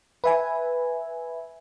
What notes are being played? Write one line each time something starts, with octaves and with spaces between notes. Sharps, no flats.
B4 E5 G#5